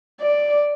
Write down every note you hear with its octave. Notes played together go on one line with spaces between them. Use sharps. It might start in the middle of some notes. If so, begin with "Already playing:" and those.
D5